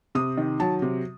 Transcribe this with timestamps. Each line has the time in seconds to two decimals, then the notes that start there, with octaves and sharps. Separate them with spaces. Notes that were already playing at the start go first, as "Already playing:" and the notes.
0.15 C3 D#6
0.38 D#3
0.60 F#3 A5
0.82 C3